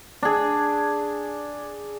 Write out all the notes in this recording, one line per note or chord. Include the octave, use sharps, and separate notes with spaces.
D4 G#4